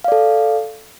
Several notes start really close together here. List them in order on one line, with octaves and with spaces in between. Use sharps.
F5 D5 A4